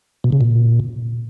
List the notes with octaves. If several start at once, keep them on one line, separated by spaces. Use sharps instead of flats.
B2
C#3
A#2